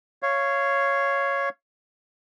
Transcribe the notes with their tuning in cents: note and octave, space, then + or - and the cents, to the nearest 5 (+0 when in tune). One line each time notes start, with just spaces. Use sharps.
C#5 +0 F5 -15